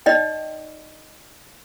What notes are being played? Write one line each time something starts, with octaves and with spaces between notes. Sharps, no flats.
D#4 D5 D#5 G5